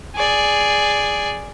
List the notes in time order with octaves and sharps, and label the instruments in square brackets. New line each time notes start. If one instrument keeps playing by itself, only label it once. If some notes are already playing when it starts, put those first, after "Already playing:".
[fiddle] G#4 D5